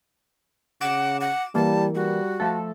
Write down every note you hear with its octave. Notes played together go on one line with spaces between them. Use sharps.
C#3 F#5 D6 E7
F#5
E3 G3 A#3 A5
G3 F#4
F3 A3 A4